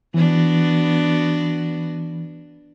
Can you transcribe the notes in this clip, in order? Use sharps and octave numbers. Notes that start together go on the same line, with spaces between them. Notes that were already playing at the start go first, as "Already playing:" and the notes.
E3 B3 D4 F#4